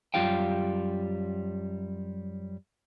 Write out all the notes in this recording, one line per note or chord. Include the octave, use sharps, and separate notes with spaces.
F#2 G3 F4 G4 F5 G5